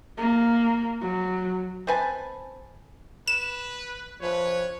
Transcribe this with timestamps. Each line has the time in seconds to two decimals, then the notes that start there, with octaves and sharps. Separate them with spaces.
0.17 A#3
1.01 F#3
1.87 C4 B4 G#5 A5
3.27 B4 E7
4.22 F3 B4 C#5